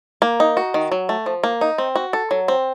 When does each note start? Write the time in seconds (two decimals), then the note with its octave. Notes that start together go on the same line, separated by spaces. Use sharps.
0.22 A#3
0.40 D#4
0.57 F#4
0.74 D#3
0.92 F#3
1.09 A3
1.26 F3
1.44 A#3
1.61 D#4
1.78 C4
1.96 F#4
2.13 A4
2.31 F#3
2.48 C4